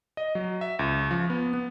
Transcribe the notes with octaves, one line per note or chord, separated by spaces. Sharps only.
D#5
F#3
E5
C#2
F3
B3
B3